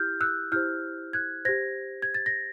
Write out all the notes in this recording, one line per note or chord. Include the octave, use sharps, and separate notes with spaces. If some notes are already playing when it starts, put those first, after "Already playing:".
Already playing: E4 G4 F6 G6
E6 F#6
E4 G4 C5 F6 G6
F#6 G#6
G4 C5 G#6 A#6
G#6
A6
A#6